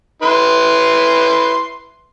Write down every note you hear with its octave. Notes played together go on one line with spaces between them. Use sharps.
E4 B4 C6